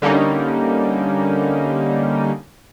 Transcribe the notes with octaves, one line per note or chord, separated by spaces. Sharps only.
D3 G3 A#3 C#4 D#4